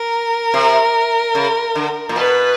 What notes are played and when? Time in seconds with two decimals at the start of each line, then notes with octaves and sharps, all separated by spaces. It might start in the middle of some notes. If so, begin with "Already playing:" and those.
Already playing: A#4
0.54 C3
1.35 C#3
1.75 D3
2.09 A#2
2.16 B2 B4